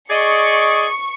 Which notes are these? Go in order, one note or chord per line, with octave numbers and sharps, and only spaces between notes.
G#4 D5 D#5 C#6 C#7